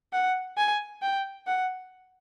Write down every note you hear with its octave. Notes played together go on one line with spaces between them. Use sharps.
F#5
G#5
G5
F#5